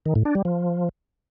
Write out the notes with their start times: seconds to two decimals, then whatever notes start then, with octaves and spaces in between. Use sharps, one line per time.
0.06 D#3
0.15 A2
0.25 D4
0.35 G3
0.45 F3